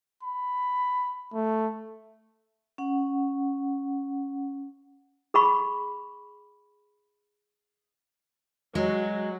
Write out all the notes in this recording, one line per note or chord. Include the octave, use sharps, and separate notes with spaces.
B5
A3
C#4 F#5
G#4 B5 C#6
F#3 G#3 F#4